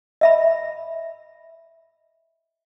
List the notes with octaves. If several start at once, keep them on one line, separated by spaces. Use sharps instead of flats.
D#5 E5 B5